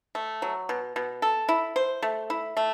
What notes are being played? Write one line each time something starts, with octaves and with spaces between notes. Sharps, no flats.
A3
F#3
B2
B2
A4
E4
C5
A3
E4
A3